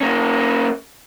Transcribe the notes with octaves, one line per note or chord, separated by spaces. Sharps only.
A#3 C#4